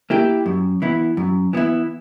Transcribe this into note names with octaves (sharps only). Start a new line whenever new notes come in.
A#3 E4 G4
F#2
E3 B3 E4
F#2
E3 B3 E4